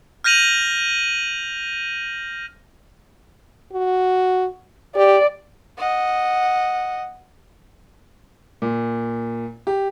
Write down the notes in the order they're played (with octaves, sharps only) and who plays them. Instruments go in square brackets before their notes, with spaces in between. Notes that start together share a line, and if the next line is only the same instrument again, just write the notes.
[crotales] F6 G6 A#6 D#7 F7 F#7
[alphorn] F#4
[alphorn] G4 [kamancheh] D5
[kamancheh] D#5 F#5
[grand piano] A#2
G4